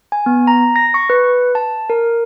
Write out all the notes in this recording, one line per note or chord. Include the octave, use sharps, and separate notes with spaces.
G#5
B3
A#5
A#6
C#6
B4
A5
A#4